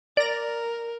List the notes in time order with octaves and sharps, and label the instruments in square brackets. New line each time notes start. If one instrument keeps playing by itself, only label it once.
[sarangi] A#4 [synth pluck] D5 A#6